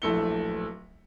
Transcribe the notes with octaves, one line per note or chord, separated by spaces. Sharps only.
D1 A#1 A3 E4 C#7 G7